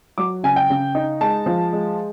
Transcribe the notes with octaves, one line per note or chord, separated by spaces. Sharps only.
F#3 D6
C#3 G#5
G5
C#3
D#4
G#3 A5
F3
G#3